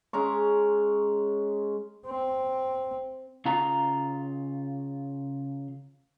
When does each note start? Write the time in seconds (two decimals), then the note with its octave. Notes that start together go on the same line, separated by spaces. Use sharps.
0.13 G#3 C#4 A#5 C#6
2.07 C4
3.45 C#3 F4 A#5